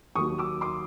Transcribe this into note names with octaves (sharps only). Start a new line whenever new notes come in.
D#2 D#3 F#3 C#6 D#6
D6 E6
C6 D6